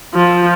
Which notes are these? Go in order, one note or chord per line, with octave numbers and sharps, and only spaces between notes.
F3